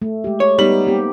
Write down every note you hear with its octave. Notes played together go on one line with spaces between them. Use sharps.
A3
G#3 G4
C#5
G3 B3 D#4 F#7
A#3 C4 G4